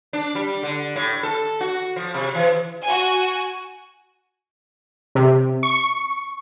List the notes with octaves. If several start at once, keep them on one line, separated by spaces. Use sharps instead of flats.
D4
G3
D3
A2
A4
F#4
F3
C3
E3
F#4 G#5
C3
C#6